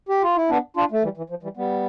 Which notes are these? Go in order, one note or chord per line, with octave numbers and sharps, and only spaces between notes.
G4
F4
E4
B3 D4
D4 F4
A3
E3 G3
E3
F3
E3 G3
G3 B3